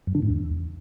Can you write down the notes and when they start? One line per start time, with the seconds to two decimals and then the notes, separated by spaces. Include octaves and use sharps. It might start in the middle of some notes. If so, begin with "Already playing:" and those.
0.07 F#2
0.15 D3
0.22 G#2
0.30 E2